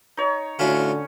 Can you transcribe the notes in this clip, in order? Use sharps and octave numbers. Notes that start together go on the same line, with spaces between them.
D#4 C#5
A2 D3 C#4 F4 F#4